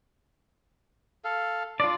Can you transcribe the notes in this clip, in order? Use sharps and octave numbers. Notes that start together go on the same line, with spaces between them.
A4 F5
D4 F4 D5